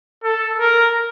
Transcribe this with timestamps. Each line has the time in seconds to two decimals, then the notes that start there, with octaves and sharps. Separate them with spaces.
0.24 A4
0.60 A#4